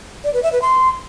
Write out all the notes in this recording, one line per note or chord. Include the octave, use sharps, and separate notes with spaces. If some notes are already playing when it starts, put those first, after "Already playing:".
D5
B4
E5
B4
C6